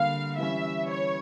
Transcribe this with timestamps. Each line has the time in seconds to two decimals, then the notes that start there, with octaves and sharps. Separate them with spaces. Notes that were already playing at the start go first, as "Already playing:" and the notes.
Already playing: D3 G3 A#3 F5
0.38 E3 G3 C#4 E5
0.90 C#5